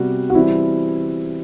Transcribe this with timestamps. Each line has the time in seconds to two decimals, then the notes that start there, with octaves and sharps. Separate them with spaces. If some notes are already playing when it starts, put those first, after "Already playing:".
Already playing: C3 G3 B3 F#4
0.30 F#4
0.35 E3 G3 C4 E4